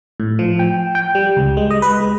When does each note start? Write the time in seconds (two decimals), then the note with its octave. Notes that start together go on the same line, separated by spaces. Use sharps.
0.20 A2
0.39 F3
0.59 G5
0.95 G5
1.15 G3
1.37 C#2
1.57 G#3
1.71 D#5
1.82 B4
2.01 G#3